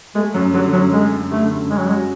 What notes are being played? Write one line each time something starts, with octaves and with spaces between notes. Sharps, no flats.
G#3 A3
F#2 F#3
D3 F#3
F#2 F#3
G#3 A3
F#2
D3 A3
F#2
G#3 C#4
F#3
G#3 F#4